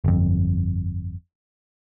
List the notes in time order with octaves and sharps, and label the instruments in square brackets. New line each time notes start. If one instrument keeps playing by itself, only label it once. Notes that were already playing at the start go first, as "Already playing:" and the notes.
[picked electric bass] G1 F2